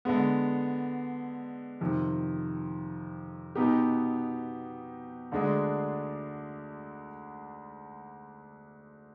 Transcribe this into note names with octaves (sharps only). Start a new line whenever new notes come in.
D3 G#3 B3
F2 C3 D#3
B2 B3 D#4 G4
D2 D3 G#3 D4 G#4